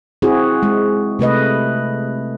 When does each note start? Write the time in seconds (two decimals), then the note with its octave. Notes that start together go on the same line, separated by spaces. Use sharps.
0.22 C4 E4 F#4 G#4
0.63 G#3
1.19 C3 A3 B4 D#5